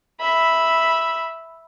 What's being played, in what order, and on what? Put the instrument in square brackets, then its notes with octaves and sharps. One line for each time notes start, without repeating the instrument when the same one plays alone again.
[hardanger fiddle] E5 B5